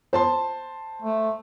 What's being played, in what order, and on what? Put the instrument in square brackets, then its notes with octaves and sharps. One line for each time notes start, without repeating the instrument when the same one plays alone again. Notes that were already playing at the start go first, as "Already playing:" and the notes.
[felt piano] C5 A5 C6
[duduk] A3